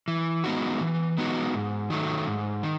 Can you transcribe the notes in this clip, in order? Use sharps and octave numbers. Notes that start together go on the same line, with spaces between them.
E3
G#3 B3 D#4 F#4
E3
G#3 B3 D#4 F#4
G#2
D#3 F#3 A3
G#2
D#3